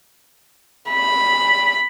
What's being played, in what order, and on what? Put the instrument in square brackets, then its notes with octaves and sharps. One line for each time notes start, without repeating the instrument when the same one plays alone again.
[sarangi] B5